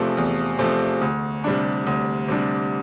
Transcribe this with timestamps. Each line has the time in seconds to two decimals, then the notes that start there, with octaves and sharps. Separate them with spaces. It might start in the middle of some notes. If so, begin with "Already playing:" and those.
Already playing: E2 C3 F3 A3
0.17 E2
0.59 C3 F3 A3
1.01 D2
1.44 C3 G3 D4
1.87 D2
2.28 C3 G3 D4